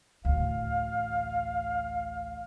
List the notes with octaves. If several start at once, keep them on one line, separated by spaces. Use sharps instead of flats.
A1 D2 F5